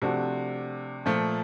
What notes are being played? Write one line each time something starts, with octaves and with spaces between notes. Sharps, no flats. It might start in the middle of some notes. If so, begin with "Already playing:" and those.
C3 F3 A3 D4 F#4
A#2 F3 A3